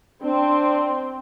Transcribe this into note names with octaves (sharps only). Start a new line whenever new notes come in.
C4 D4